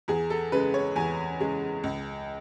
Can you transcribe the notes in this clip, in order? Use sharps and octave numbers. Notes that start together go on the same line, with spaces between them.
E2 G#4
A4
C#3 G#3 B4
C#5
E2 G#5
C#3 G#3
C#2